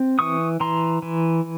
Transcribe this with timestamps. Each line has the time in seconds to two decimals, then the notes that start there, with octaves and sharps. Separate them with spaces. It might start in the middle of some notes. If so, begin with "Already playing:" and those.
Already playing: C4
0.19 E3 C#6 D#6
0.60 E3 A#5 C6
1.02 E3